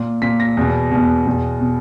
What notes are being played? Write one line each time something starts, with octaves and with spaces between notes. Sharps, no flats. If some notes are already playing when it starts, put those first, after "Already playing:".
Already playing: A#2
A#2 B6
A#6
E2 B2
E2 B2
E2 B2
B2